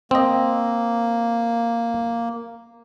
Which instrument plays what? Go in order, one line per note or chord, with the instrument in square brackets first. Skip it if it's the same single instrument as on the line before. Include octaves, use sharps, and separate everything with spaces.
[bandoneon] A#3 [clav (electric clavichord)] C4 D#5